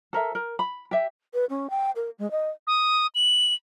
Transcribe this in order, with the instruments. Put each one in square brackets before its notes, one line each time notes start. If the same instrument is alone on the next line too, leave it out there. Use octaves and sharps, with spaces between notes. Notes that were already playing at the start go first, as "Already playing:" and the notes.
[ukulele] A4 A#4 E5
A#4
B5
G4 E5
[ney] B4
C#4
G5
A#4
G#3
D#5
[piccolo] D#6
F#7